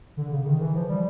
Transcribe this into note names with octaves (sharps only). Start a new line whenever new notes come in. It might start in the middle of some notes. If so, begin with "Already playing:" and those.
D3
C#3
D#3
E3
F3
G3